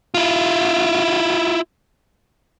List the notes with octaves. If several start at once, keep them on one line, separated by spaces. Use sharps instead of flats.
E4 F4